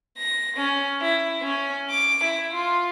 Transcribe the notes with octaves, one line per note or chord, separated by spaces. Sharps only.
A#6
C#4
E4
C#4
D6
E4
F4